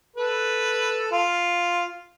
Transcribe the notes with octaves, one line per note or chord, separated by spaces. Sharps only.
A4 B4
F4